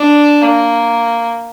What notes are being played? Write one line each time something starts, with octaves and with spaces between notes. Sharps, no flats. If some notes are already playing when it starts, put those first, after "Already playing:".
Already playing: D4
A#3